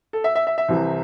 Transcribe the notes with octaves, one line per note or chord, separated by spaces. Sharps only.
A4
E5
E5
E5
E5
C2 C3 E3